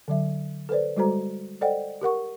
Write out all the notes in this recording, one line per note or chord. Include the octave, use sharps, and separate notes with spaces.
D3 F#3 E5
A4 B4 C5 D5
G3 G#3 F#4 A4 C5 A#5
A4 C5 D5 D#5 F#5 G5
G4 A#4 F#5 C#6